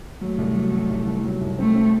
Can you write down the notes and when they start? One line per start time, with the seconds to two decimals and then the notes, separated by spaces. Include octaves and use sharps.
0.20 F#3 A3
0.38 C2
0.55 F#3
0.72 F#3
0.90 C2
1.07 C2
1.24 F#3
1.41 C2
1.58 A3 C4
1.75 C4